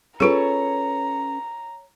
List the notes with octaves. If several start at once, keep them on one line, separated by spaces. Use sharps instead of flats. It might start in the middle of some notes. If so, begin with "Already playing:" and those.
C#4 F4 G#4 A4 B4 C#5 A#5